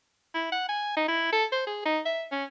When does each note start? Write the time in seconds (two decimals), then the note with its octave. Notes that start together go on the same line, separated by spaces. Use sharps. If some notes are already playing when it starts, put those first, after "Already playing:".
0.35 E4
0.52 F#5
0.69 G#5
0.97 D#4
1.08 E4
1.33 A4
1.52 C5
1.67 G#4
1.86 D#4
2.06 E5
2.32 C#4